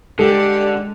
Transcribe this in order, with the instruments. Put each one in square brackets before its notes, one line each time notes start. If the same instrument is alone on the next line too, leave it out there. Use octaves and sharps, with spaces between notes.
[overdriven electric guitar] D3 [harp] G#3 [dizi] G4 [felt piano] A4